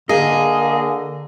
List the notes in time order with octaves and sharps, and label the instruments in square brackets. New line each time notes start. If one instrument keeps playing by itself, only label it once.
[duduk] D3 [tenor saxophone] A#3 [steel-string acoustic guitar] G#4 [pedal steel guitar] D#5